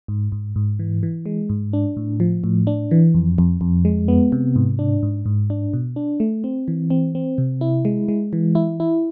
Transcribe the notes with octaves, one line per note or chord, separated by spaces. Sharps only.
G#2
G#2
G#2
E3
E3
G#3
G#2
D4
A2
F3
A2
D4
E3
F2
F2
F2
G#3
B3
C3
G#2
D4
G#2
G#2
D4
B2
D4
A3
C4
E3
C4
C4
C3
E4
G#3
G#3
E3
E4
E4